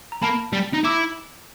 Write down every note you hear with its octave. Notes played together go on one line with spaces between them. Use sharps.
A#5
A#3 A5 B5
G3
D#4
E4 D6 E6